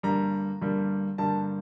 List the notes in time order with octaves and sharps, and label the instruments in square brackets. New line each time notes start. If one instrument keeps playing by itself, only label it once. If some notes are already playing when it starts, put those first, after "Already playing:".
[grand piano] G2 D3 G3 A#3 A#5
G2 D3 G3 A#3
G2 D3 G3 A#3 A5